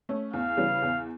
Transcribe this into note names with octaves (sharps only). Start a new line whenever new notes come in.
A3 C#4
E2 F5
C#3 E3 G3
E2